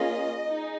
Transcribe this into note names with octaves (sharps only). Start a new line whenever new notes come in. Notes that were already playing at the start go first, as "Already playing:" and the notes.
Already playing: A#3 C#4 F4 G#4 D#5
D#4 G#4